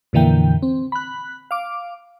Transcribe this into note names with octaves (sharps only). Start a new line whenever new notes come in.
F2 A#2 D3 E3 A#3 G5
C4
B5 F#6
F5 D6